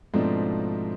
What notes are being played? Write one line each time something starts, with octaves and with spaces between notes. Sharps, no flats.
G#2 B2 F3 A3 C4 D4